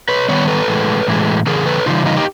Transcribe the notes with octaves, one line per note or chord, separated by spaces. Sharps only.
B4 C#5
D#3 G3 B3 B4 C#5
A4 B4
A2 E3 G#3
A2 E3 G#3
C#3 E3 G#4 A#4
A4 B4
C#3 E3 G3 D#4 F4
D#4 F4
G4